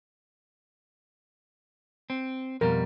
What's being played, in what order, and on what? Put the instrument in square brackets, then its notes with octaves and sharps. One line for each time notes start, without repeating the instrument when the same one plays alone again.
[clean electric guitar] C4
[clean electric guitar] F2 B2 G3 [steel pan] A#4